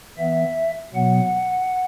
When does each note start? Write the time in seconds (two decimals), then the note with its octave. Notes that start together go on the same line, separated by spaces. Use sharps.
0.18 E3 B3 E5
0.94 B2 F#3 B3 F#5